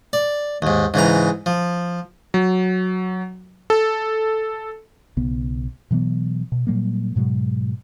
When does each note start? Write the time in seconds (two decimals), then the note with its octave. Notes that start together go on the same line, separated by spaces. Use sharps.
0.13 D5
0.62 D#2 G#2
0.94 G#2 C#3 E3 A#5
1.46 F3
2.34 F#3
3.70 A4
5.17 B1 C#3 B3
5.91 B2 E3 F#3 B3
6.52 B2
6.67 A#2 F#3 G3 A#3
7.16 G#2 B2 F#3 G#3